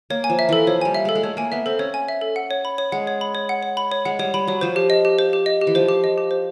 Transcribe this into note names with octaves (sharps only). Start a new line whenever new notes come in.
A#3 C#5
G#5
F3
E5
E3 A4
F3 C#5
G3 G#5
E5
G#3 A4
G#3
A3 C#5
A#3 G#5
B3 E5
C4 A4
C#4 C#5
G#5
E5
A4
F#5
C#5
B5
C#5
G#3 F#5
C#5
B5
C#5
F#5
C#5
B5
C#5
G#3 F#5
G3 C#5
G3 B5
F#3 C#5
F3 C5
G4
D#5
G4
C5
G4
D#5
G4
E3
F3 C5
G4
D#5
G4
C5